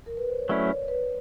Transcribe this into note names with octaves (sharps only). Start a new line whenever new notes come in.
A#4
B4
C5
C#5
F#3 A3 C#4 E4 D5
C#5
B4